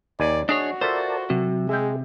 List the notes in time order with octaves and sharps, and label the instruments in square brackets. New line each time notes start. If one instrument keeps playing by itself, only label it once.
[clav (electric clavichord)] D#2 G#5 [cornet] D5
[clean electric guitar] D4 G#4 C#5 [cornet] F#4 [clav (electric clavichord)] D#5
[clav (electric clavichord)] F4 A4 E5 [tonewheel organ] A#4 D5 A5 [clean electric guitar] C5
[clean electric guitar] C3 [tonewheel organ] F#3
[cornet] G#3 [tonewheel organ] G#4 [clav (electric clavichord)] E5 G5